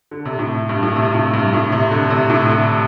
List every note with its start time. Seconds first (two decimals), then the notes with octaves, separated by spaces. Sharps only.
0.11 D3
0.25 C3
0.39 A2
0.69 G2
0.83 A2
0.96 C3
1.15 A2
1.34 G2
1.53 A2
1.72 C3
1.91 D3
2.10 C3
2.30 A2
2.48 D3